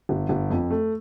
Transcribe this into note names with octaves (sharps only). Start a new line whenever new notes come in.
G1
G1
F2
A3